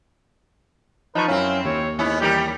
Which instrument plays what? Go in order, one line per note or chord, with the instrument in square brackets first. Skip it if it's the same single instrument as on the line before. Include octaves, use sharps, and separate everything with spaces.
[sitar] F3 [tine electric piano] D#4 A5 C#6 [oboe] B4
[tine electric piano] F#2 C#4 [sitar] C4 E4 [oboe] F5
[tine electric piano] D#2 [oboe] C#5
[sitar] G#2 C#4 E4 [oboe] B3
[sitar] E2 G3 A#4 [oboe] G4